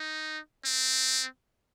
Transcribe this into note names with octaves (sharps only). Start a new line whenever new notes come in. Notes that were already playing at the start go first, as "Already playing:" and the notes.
Already playing: D#4
C4